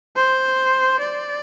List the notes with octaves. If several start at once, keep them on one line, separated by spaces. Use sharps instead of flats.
C5
D5